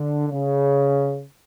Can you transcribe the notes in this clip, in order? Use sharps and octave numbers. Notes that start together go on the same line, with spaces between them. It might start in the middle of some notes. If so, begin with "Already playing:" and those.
Already playing: D3
C#3